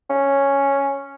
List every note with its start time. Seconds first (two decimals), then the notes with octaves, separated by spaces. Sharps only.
0.10 C#4